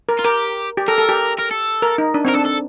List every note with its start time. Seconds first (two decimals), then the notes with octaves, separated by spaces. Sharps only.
0.09 A#4
0.19 F4
0.24 G4 A#4
0.77 G4
0.88 A4 A#4
0.98 A4
1.09 G4
1.39 A#4
1.51 A4
1.82 A#4
1.98 D#4
2.14 D4
2.25 C4
2.29 A#4
2.35 D4 A4
2.46 A4